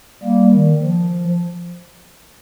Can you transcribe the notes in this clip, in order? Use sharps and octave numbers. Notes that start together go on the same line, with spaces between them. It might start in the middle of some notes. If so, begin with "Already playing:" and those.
G3 A#3
D#3
F3